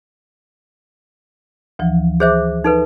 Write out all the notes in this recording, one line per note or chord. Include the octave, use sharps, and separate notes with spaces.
D2 E3 F3
G#4 C5 E5 D6 G6
D#4 A4 B4